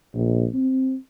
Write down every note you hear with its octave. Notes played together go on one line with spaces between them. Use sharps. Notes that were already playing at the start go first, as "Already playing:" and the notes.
A#1
C4